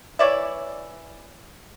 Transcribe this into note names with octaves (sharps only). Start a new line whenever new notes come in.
E3 C#5 D5 E5